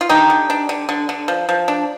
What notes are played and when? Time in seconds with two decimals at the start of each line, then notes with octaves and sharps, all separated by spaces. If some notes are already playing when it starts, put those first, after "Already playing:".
0.01 F4
0.09 D3 D#4 G4
0.30 D3
0.50 D4
0.69 D3
0.89 D3
1.09 D3
1.28 F3
1.49 F3
1.68 D4